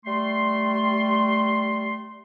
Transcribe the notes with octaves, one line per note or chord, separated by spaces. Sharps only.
G3 A3 C6